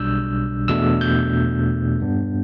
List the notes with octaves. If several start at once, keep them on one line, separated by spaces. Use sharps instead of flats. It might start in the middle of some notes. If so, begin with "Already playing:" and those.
Already playing: B1 B2 G3 D4 E6 G6
E2 B2 A3 D4 E6
G6
G2 G3 B3 D4